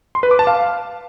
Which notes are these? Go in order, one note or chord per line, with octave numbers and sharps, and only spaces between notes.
C6
B4
D6
A5
F5